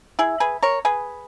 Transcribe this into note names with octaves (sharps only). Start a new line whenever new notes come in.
E4 G#4
G#4 B4
A#4 C#5
G#4 B4